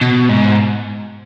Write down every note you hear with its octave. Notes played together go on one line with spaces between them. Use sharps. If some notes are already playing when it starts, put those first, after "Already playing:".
B2
G#2